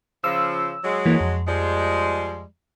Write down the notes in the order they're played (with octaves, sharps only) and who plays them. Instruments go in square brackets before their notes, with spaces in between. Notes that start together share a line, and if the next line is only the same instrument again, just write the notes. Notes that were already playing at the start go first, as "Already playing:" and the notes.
[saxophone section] C#3 F3 [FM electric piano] E6
[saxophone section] F#3 G#3
[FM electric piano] E3 A#3
F2
[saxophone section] F3 G3 G#3